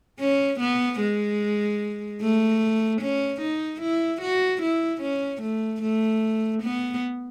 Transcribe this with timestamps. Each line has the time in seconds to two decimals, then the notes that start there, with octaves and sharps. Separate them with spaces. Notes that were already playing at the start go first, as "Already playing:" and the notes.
0.20 C#4
0.60 B3
1.01 G#3
2.21 A3
3.02 C#4
3.41 D#4
3.81 E4
4.22 F#4
4.62 E4
5.02 C#4
5.42 A3
5.82 A3
6.63 B3